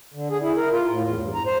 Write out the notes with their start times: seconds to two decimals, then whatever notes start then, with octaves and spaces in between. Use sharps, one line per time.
0.14 D3
0.30 G#4
0.42 E4
0.57 A#4
0.72 F4
0.89 A2
1.04 E2
1.19 G2
1.34 A#5
1.46 C5